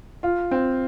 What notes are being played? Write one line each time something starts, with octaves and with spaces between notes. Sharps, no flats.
F4
C4